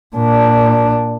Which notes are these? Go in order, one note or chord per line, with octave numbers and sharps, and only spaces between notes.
A#2 D4